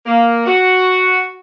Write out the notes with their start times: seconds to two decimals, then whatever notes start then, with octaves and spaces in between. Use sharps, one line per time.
0.06 A#3
0.45 F#4